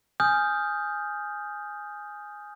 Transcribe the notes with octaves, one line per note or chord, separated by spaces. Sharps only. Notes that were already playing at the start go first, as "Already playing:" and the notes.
G#5 D#6 F6 G6